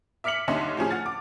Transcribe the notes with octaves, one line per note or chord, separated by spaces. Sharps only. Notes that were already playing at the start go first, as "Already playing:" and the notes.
E5 D6 F6 B6 C#7 F#7
D#2 D3 C#4 D#4 E5 C6
A2 F3 C#4 G#4
F#5 F6 A6
D6